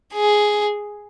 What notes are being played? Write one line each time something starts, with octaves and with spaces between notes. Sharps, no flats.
G#4